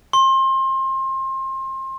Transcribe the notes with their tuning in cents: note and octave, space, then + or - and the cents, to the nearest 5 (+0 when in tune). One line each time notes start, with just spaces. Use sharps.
C6 +30